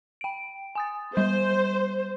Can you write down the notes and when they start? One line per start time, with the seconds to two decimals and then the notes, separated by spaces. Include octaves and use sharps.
0.21 G5 D7
0.75 G#5 D#6 A6
1.17 G3 C5